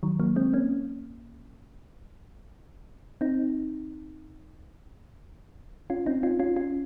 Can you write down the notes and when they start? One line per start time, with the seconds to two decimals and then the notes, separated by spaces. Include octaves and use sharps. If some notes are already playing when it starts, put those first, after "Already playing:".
0.03 D#3 F#3
0.20 F#3 A#3
0.36 G#3 C4
0.53 A#3 C#4
3.21 C4 D#4
5.90 C#4 F4
6.06 C4 D#4
6.23 C#4 F4
6.39 C#4 F4
6.56 C#4 F4